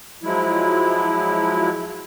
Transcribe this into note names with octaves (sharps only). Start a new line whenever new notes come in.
F3 F#3 G#3 E4